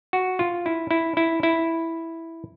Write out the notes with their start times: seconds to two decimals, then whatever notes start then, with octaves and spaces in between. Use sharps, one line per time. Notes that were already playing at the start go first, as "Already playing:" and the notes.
0.13 F#4
0.39 F4
0.66 E4
0.91 E4
1.17 E4
1.43 E4